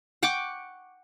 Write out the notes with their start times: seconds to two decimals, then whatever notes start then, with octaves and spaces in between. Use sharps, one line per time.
0.23 F#5 G5 C#6 D6